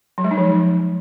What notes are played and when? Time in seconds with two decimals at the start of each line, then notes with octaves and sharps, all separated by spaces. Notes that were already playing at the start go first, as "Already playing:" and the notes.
0.18 F#3
0.24 G#3
0.31 D#4
0.38 F3